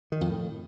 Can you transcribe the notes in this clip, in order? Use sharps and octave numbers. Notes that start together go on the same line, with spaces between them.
D#3
F2
A2